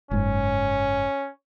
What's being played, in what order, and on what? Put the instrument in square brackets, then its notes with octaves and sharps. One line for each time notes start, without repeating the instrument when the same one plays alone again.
[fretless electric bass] F#1 G#2 [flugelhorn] C#4